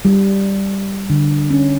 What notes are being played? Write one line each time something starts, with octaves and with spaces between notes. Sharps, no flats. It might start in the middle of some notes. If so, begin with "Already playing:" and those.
G3
D3
C#4